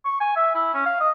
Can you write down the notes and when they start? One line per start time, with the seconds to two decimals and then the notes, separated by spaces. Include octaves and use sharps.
0.05 C#6
0.20 G#5
0.36 E5
0.55 E4
0.74 C#4
0.86 F5
1.00 D#5